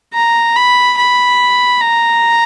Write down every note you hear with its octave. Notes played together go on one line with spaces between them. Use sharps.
A#5
B5
B5
A#5